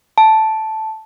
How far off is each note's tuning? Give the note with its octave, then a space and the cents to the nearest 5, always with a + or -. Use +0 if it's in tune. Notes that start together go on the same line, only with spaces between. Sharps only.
A5 -5